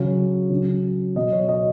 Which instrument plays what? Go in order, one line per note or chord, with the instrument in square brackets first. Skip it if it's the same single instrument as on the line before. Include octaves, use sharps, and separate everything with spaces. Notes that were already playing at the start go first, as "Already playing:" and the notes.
Already playing: [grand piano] C#3 F#3
C#3 F#3
B2 F#3 D#5
C#5
D#5